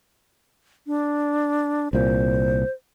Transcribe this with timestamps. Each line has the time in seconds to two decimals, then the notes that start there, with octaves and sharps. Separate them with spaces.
0.87 D4
1.93 C2 A#2 C5